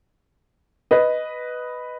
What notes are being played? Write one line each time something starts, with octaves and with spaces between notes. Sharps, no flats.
B4 D#5